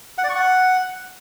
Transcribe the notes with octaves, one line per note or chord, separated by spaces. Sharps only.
F#5
D5
C#6
F#5